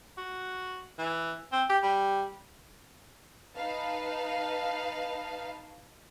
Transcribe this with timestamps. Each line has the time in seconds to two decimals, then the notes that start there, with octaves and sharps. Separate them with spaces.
0.17 F#4
0.98 E3
1.52 C4
1.69 G4
1.83 G3
3.55 D#4 B4 F5 A5